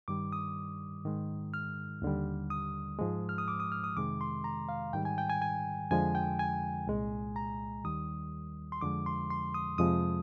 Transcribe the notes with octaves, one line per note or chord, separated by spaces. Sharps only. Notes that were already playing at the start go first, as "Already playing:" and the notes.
G2 D#3 G3 D6
D#6
G#2 D#3 G#3
F6
D#2 D3 G3
D#6
G#2 F3 G#3
F6
D#6
D6
D#6
F6
D#6
F2 C3 D#3 G#3 D6
C6
A#5
F5
G#2 D#3 G3 G5
G#5
G5
G#5
G#5
F2 D3 F3 G#3 G#5
G5
G#5
C2 A#2 G#3
A#5
D#2 D#3 G3 D#6
C6
F2 D3 F3 G#3 D6
C6
C6
D#6
F2 C3 F3 G#3 D#6